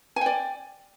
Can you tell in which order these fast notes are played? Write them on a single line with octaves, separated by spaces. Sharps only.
G#5 G5 D5